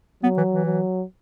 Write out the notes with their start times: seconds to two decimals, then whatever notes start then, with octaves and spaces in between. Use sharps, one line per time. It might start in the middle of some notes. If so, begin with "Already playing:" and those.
0.23 F#3 B3
0.38 E3
0.51 E3
0.66 F#3